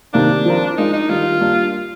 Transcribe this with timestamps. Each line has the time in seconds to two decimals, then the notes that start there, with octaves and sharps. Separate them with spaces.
0.14 C3 D#3 A#3 D4
0.45 F3 C4 F4 A#4
0.78 G#3 D4 D#4 F4 A#4
0.93 D#4
1.09 D#3 G3 D4 F4 G4 A#4
1.41 G3 A#3 D4